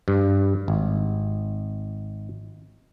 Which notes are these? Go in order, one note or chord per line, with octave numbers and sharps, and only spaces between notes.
G2
G#1